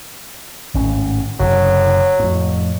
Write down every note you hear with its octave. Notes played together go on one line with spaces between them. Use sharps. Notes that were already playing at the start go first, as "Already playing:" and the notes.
G#1 A2 C#4
F#1 A2 C3 F#3
F2 A2